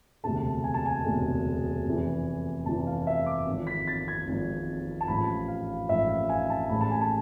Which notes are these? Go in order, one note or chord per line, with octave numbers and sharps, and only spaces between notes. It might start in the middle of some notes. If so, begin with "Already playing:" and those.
E1 D2 C3 G#3 A5
G#5
A5
G#5
E1 D2 C3 G#3
F1 F2 E3
F1 F2 E3 A5
F5
E5
D6
G#1 G#2 F3
B6
A6
G#6
G#1 G#2 F3
A5
A1 G#2 F3 B5
F5
A1 G#2 F3 E5
F5
G#5
A5
A1 A2 G#3 B5
A5
G#5
A5